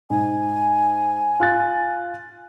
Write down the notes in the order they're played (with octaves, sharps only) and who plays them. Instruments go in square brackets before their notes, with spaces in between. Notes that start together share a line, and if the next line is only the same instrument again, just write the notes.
[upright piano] G#2 [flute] G#5
[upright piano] F4 F#6 A6